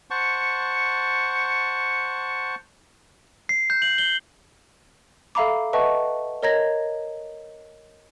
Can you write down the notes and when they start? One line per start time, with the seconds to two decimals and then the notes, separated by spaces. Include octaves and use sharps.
0.10 C5 F#5 A5 C#6
3.49 C7
3.70 G6
3.82 F#7
3.98 G7
5.35 A4 E5 F5 A#5 B5 D6
5.73 B4 D#5 E5 F#5 A5 C#6
6.43 A#4 C#5 D#5 A#5 G#6 A#6